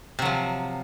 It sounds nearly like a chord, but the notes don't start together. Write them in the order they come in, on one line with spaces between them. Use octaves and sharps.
C3 F#3 F3